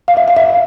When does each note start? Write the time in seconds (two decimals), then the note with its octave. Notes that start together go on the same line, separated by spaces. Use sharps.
0.08 F5
0.17 E5
0.28 F5
0.36 E5